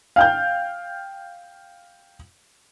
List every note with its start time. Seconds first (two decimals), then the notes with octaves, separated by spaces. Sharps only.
0.16 F5 G5 G6